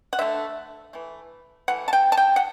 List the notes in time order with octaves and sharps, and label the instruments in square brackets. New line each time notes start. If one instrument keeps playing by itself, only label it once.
[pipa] F#5
D3 A3 E5
E3 A3
E3 A3 F#5
A5
G5
A5
G5
F#5